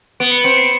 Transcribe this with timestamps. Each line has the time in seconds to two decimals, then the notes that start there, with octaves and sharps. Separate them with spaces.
0.20 B3 D7
0.32 C#7
0.44 C4 C#7
0.58 C7